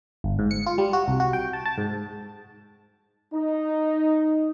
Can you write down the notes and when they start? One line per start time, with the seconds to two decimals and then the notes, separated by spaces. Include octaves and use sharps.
0.24 G1
0.39 G#2
0.51 C#7
0.66 F4
0.78 G3
0.93 F#4
1.08 C2
1.20 F#4
1.33 G5
1.53 A5
1.65 A5
1.78 G#2
3.35 D#4